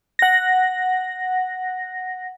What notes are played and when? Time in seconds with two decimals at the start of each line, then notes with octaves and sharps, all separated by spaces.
0.19 F#5 A#6